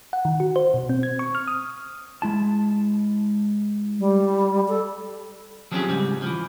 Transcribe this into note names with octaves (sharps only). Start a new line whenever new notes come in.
F#5
D#3
F#4
C5
B2
C4
G#6
C#6
F6
D#6
G#3 E4 A5
G3
A4
F3 F#3 C4 C#4 G4 G#4
G#2 C#3 G3 C4
E3 F3